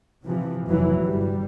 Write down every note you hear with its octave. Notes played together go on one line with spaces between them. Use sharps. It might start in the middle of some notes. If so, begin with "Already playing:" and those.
C3 E3 F3
F1 E3 F#3
G1 G3